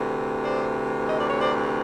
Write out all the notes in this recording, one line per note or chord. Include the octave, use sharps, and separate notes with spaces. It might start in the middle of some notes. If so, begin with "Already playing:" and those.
Already playing: D2 C3 E3
C5 D5
D#5
D5
C#5
C5 D5